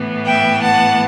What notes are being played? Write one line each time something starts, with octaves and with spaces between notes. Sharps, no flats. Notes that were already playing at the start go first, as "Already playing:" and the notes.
Already playing: A2 E3 B3
E5 G5
F#5 A5